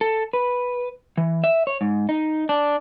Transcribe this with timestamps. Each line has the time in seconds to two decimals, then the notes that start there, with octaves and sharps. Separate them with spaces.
0.01 A4
0.33 B4
1.17 E3
1.44 E5
1.67 C#5
1.81 G#2
2.09 D#4
2.49 D4